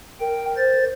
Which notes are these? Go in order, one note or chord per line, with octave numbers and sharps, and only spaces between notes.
A#4 G5
C5 A6